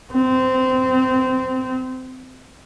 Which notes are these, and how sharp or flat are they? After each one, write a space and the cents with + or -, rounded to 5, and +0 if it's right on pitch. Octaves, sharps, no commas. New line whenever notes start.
C4 -20